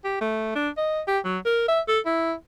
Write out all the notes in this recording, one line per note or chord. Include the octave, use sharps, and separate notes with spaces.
G4
A3
D4
D#5
G4
F#3
A#4
E5
A4
E4